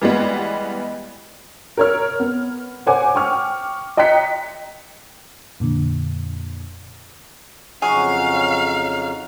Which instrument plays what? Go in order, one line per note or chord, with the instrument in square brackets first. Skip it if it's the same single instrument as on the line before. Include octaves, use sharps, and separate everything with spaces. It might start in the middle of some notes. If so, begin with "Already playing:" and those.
[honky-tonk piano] E3 G3 G#3 B3
A#4 C#5 F6
B3
C5 C#5 F#5 G#5 D6
G5 C#6 F6
D#5 G5 A#5 F#6 B6 C#7
[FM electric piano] F2 A#2 D3
[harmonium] F2 C#3 D#4 [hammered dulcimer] F#3 [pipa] G#4 [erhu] F5